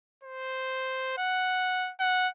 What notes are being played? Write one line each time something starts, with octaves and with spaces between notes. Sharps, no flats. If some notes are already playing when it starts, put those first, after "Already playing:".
C5
F#5
F#5